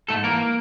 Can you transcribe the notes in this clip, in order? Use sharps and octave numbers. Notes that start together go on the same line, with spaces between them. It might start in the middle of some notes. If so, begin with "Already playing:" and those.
G#2 A3 A4
E3 A#3 A#4